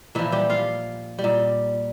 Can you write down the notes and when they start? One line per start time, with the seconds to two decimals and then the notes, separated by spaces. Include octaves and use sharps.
0.15 A#2 E3 F3 E4
0.32 G3 G4
0.50 F4 F5
1.19 G3
1.24 A#2